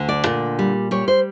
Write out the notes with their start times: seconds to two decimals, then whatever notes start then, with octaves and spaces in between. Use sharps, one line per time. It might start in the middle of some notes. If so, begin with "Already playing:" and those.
Already playing: D2 D3
0.08 D5
0.26 A#2
0.59 G3
0.91 G3 C#5
1.08 C5